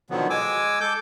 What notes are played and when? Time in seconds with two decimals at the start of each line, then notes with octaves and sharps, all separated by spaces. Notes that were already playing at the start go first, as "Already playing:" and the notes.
0.10 B2 D3 D#3 F3 F#3 B3
0.30 G#3 G#5 D6 E6
0.81 A4 D6 G6